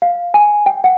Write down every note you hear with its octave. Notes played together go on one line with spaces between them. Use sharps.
F5
G#5
G5
F#5